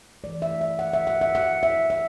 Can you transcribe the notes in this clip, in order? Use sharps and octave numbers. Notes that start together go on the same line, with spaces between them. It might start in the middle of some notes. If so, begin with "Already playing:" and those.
E3 A3 D5
E5
E5
F#5
E5
F#5
E5
F#5
E5
E5